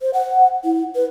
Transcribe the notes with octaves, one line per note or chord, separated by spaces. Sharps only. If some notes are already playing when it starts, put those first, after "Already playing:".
C5
F#5
E4
B4